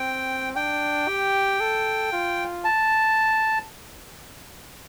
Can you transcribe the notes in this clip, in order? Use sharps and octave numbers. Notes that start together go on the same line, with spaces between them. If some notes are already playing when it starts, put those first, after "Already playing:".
Already playing: C4 G5
D4 G5
G4
A4
F4
A5